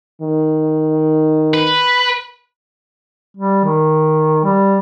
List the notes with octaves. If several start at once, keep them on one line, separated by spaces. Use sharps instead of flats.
D#3
B4
G3
D#3
G3